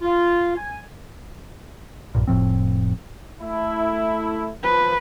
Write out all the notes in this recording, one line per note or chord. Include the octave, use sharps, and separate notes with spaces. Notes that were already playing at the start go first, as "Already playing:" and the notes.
F4
G#5
B1 G2 A#2
F1 A2 F3 C4
A3 E4
F3 B4